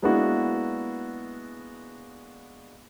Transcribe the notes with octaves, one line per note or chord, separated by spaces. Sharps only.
G#3 A#3 B3 D4 E4 F#4